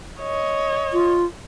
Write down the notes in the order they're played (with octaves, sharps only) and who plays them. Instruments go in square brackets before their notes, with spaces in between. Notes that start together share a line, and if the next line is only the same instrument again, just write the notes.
[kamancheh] C#5 D#5
[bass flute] F4